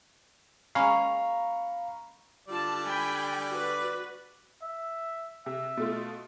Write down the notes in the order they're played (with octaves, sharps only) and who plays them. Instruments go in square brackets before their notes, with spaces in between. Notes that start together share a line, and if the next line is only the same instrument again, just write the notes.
[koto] G#3 A#3 C#4 [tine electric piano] F5 [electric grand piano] A#5 B5 C#6
[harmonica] D3 G3 D5 [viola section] F4 A5
[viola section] G5 G#5 B5
F#4 B4
[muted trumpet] E5
[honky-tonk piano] C3 [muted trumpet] E5
[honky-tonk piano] B2 A3 F4